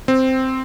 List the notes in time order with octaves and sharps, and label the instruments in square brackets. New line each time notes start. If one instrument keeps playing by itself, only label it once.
[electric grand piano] C4